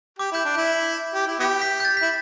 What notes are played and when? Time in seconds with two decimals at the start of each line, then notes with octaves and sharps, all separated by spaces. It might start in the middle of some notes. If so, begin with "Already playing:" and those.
0.19 G4 D6
0.32 E4 G6
0.45 D4
0.57 E4
1.14 G4
1.27 E4
1.40 B3 E4 G4
1.62 B6
1.80 G6
1.85 A6
1.97 E4 B6